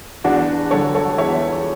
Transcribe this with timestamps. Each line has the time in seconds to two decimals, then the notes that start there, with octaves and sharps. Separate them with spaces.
0.24 E2 D4 F#4
0.71 D3 F#3 A4 C#5
0.95 A4 C#5
1.18 E2 C#5 E5